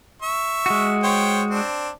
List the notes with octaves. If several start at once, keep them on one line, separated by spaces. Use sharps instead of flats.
E5 C#6
G#3 F#4
C5 C#5 G5
C4 D4